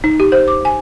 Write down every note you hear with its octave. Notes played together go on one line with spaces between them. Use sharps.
D#4
G4
C5
D6
G#5